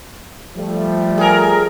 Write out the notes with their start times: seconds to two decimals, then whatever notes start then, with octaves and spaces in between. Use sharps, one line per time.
0.56 F3 G3 A3
1.18 G#4 A#4